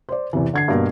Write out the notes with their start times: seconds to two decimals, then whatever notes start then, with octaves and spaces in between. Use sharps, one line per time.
0.09 C5 D5
0.33 E2 C3 E3
0.54 D3 G#6 C7
0.68 G2 B2 A#3 A#4